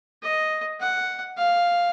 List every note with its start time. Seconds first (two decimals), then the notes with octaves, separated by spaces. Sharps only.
0.22 D#5
0.80 F#5
1.38 F5